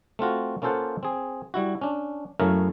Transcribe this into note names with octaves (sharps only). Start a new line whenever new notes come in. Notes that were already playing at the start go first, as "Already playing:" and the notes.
A3 C4 F4 F#4
A#3 C#4 F4 A4 C5 F#5
C4 G#4
G3 E4 F#4
C#4 D4
F#2 A3 C#4 E4 A#4 F5